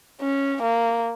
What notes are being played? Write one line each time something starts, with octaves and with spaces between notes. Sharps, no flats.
C#4
A#3